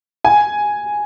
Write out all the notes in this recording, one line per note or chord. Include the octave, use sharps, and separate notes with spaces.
G#5